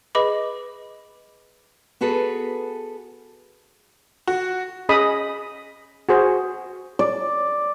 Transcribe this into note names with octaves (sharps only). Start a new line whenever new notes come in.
G#4 B4 D#5 B5 D6
B3 F#4 G#4 A4 B4
F#4
C#4 G#4 D#5 B5 D#6
F#4 G#4 C5
D5